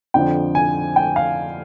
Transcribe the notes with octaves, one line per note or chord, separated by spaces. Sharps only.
F2 D3 F3 G5
G#5
G5
F5